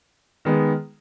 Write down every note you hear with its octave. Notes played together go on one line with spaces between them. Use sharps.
D#3 G#3 B3